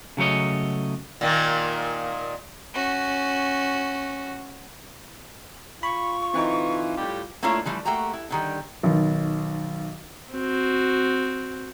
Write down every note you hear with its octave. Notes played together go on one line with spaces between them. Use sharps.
C#3 F#3 A3 C#5 D#5
A#2 D#3 A#3
C#4 F#4
F4 B5 C#6
D3 E3 C4 D#4
A2 G3 G4
A3 A#3 D4 E4 F4 C#5
E3 F3 G3 A3
A3 A#3 F#4 G4 A#5
E4
D3 D#3 G3
B1 D#3
C4 F#4